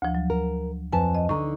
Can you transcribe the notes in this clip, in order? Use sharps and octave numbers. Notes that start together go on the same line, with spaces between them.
D2 F3
F#3
A#4
F2 B4 G#5 A5
D#5
D3 D#4 A#5 C#6